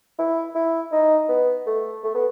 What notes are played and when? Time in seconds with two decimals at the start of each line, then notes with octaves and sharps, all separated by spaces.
0.19 E4
0.55 E4
0.92 D#4
1.29 B3
1.67 A3
2.04 A3
2.14 B3